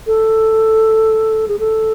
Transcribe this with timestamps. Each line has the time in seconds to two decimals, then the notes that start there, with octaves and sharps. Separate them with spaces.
0.07 A4
1.48 G#4
1.59 A4